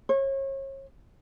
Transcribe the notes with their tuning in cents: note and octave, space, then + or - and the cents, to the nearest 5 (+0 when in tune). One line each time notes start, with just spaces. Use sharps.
C#5 -35